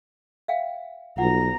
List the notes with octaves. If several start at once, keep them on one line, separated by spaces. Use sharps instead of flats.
E5 F5 G5
B1 F4 F#5 A#5